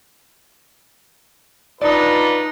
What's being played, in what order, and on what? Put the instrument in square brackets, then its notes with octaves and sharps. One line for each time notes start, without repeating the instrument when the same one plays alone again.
[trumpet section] D4 F4 B4 [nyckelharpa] D#4 [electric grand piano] D5